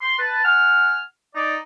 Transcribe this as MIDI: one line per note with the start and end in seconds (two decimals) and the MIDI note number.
0.01 0.18 84
0.19 0.44 71
0.19 0.44 81
0.45 1.00 78
0.45 1.00 80
0.45 1.00 89
1.35 1.57 63
1.35 1.57 74